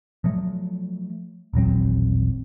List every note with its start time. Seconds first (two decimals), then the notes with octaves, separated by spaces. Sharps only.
0.24 F3 F#3 A3
1.53 D#1 A1 F#3 C4